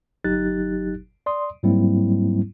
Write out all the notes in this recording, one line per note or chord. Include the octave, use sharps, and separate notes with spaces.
G1 F#3 D#4 G4 F#6 A6
D5 C6 D#6
G#2 F#3 G3 A#3 C4 E4